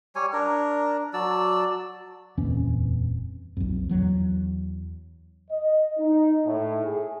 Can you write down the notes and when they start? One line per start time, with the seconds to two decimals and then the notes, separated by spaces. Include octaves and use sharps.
0.16 G3 C#5 G#5
0.33 D4 A#4
1.14 F#3 D5 A5 E6
2.37 D#1 F2 E3 C#4
3.57 B1 F2
3.89 E2 F#3
5.51 D#5
5.99 D#4
6.46 A2
6.85 G#4